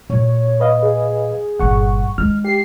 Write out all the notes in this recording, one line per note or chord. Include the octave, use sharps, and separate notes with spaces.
A#2 A#3 C#5
B4 D#5 F5
G#4
G1 A#2 F#5 C#6
G#3 D#4 F6
G4 C7